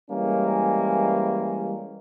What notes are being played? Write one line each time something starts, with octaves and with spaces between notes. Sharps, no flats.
E3 G3 G#3 A#3 C#4